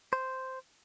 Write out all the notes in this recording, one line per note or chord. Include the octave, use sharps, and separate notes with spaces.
C5